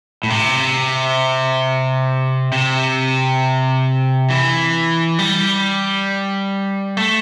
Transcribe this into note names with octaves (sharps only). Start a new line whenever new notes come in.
A2
C3
C3
E3
G3
A3